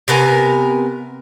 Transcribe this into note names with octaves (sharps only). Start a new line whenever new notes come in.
C3 B3 A#4 G#5